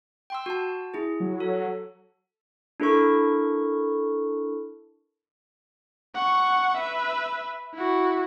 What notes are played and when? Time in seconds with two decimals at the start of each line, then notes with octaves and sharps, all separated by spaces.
0.30 G5 C6 E6
0.46 F#4 A5
0.94 E4 G#4
1.20 F#3
1.40 A4
2.80 D4 E4 A4 A#4 C#6
6.15 F#5 C#6
6.78 B4 E5
7.74 E4 F#4